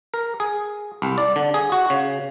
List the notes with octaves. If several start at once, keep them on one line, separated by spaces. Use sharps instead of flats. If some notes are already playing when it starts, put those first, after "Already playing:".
A#4
G#4
C2
D5
D3
G#4
F#4
C#3